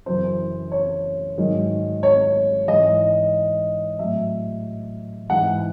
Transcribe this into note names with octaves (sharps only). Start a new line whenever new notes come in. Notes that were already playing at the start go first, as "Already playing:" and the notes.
F#2 C#3 E3 C5
C#5
G#2 D#3 F#3
C#5
G#2 E3 D#5
A2 F#3 E5
G#2 E3 F#5